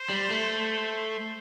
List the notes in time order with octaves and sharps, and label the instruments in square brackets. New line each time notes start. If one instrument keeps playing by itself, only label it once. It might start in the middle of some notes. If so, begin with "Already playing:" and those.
Already playing: [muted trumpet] C5
[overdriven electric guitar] G3
A3
[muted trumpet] C5